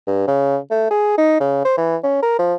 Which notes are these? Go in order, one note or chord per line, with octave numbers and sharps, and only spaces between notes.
G2
C#3
A3
G#4
D#4
C#3
C5
E3
C#4
A#4
F3